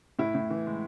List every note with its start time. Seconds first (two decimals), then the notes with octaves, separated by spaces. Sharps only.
0.19 A2 E4
0.35 A2
0.50 E3
0.66 G#3